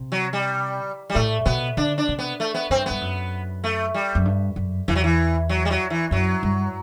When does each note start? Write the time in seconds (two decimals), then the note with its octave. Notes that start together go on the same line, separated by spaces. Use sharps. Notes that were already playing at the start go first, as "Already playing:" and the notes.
Already playing: C3
0.12 F#3
0.33 G3
1.10 G3
1.15 A2 A3
1.46 B2 B3
1.77 D3 D4
1.98 D4
2.08 C3
2.19 B3
2.40 A3
2.54 B3
2.70 G2 C4
2.86 G2 B3
3.01 F#2
3.64 A3
3.94 G3
4.15 F#2
4.25 G2
4.56 F#2
4.88 E2 E3
4.96 F#3
5.04 E3
5.49 F#3
5.65 G3
5.71 F#3
5.90 E3
6.11 F#2 F#3
6.43 G2